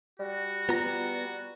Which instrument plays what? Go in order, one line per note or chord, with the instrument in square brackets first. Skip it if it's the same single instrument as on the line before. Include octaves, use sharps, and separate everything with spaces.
[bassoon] G3 [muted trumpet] F#4
[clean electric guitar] B3 A#5 [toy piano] F4